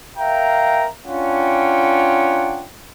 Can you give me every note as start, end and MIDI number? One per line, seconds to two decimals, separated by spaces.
0.18 0.87 70
0.18 0.87 76
0.18 0.87 77
0.18 0.87 79
0.18 0.87 82
1.07 2.66 61
1.07 2.66 62
1.07 2.66 65
1.07 2.66 78
1.07 2.66 79